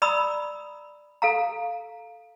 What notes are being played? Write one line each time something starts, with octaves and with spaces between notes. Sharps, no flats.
D5 A#5 B5 D#6 E6
A4 F5 A#5